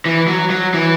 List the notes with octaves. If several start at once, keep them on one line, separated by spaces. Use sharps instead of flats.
E3
F#3
F#3
E3